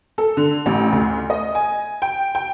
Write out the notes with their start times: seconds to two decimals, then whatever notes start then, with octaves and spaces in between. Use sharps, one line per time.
0.18 A4
0.37 D3
0.66 A1
0.92 D2
1.30 D#5
1.55 G#5
2.02 G5
2.35 G5